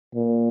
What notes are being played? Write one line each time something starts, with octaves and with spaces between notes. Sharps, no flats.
A#2